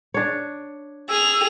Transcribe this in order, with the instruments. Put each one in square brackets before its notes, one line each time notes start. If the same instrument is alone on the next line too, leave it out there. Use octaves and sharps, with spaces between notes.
[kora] D4 C#5
[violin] G#4 F7 [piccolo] E6